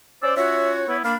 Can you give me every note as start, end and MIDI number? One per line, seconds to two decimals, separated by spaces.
0.22 0.35 61
0.22 0.35 72
0.22 0.35 74
0.22 0.35 88
0.37 0.83 61
0.37 0.83 65
0.37 0.83 66
0.37 0.97 73
0.37 0.71 76
0.88 0.99 59
0.88 1.01 64
1.04 1.15 58
1.04 1.15 62
1.04 1.15 77
1.04 1.14 83